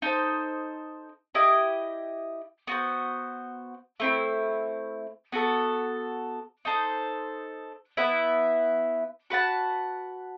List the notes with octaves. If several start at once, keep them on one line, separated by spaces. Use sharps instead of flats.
D#4 A4 C5
E4 G4 D#5
B3 F#4 C5
A3 C4 E4
B3 F#4 A4
D#4 A4 C5
B3 E4 B4 E5
F#4 B4 F#5 A5